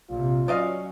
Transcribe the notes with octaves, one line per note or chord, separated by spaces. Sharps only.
A#1 C3 F4
F#3 C#4 D5 D#5 F5